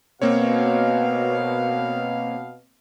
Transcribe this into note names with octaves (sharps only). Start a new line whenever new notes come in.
B2 A#3 C4 C#5 F5